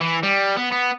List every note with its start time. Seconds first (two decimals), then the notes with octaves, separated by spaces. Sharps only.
0.01 E3
0.23 G3
0.56 B3
0.72 B3